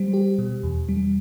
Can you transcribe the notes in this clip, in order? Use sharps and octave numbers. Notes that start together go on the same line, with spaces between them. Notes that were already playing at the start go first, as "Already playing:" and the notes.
Already playing: G3 G4 C5
G4
B2
E2
G3